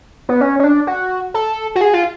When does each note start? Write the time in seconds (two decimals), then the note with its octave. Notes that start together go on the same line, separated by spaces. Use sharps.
0.29 B3
0.41 C#4
0.59 C#4
0.64 D4
0.87 F#4
1.34 A4
1.75 F#4
1.81 G#4
1.94 F4